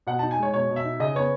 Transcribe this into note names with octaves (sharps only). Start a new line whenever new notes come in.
B2 F#5
D#4 A5
G#5
G#3 C#5
B2 C#5
B2
E5
D#4
C#3 D#5
B3 C#5